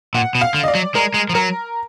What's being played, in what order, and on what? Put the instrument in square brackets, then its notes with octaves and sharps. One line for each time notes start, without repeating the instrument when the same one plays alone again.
[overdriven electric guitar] A#2 [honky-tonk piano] F#5
[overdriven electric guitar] B2
[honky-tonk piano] F5
[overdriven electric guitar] D3
[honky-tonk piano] D#5
D5
[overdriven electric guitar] F#3
[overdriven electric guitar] G#3 [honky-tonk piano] A#4
[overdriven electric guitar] G#3
F3
[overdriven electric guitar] F#3 [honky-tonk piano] A#4